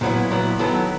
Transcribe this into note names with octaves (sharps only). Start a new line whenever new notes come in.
A#2 F#3 B3 E4
A#2 F#3 B3 E4
D#3 F#3 B3 E4 A4